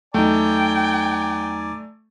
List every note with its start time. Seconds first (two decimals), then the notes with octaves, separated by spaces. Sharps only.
0.14 E2 F#3 A3 D#4 D5 G5 G#5 A#5